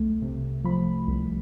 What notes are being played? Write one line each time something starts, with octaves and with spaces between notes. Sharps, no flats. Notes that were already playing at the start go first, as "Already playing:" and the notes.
Already playing: C2 A3
C3
F3 B5
C2